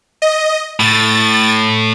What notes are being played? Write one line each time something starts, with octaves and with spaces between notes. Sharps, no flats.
D#5
A2 A6